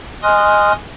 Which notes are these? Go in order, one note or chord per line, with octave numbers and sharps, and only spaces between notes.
D#5 G#5 C6 D#6 F6 F#6